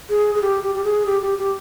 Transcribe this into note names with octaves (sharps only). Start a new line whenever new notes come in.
G#4
G#4
G4
G4
G4
G#4
G4
G4
G4